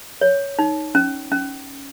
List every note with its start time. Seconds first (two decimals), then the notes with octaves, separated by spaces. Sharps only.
0.21 C#5
0.59 D#4
0.95 C#4
1.32 C#4